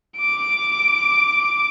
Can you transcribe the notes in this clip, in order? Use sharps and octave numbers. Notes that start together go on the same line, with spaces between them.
D6 D7